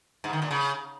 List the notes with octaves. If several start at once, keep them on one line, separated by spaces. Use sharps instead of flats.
G#2
D#3
A#2
C#3